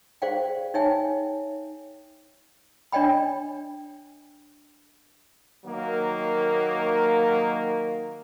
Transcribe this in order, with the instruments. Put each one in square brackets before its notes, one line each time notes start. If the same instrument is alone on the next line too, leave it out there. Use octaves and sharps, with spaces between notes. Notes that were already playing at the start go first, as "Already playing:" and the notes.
[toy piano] G#4 C5 D5 F5 G5
D#4 C#5 E5 G5 G#5
D4 C#5 D#5 G5 B5
[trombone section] D#3 F#3 A#3